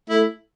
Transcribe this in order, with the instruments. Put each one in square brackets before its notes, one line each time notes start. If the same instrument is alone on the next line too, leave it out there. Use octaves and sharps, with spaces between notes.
[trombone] A3 [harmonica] E4